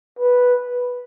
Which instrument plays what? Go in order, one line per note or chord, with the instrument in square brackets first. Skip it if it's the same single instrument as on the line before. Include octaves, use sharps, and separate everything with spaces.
[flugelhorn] B4